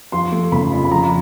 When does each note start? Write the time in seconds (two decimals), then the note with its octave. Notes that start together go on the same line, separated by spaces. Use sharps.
0.12 F3 C6
0.32 A3
0.52 C#3 B5
0.72 F2
0.85 B5
0.91 F3 A#5